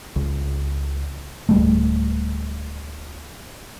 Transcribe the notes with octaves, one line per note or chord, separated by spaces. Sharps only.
C#2
D1 G3 A3